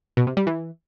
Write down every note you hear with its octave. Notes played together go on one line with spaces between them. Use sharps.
B2
C3
G3
E3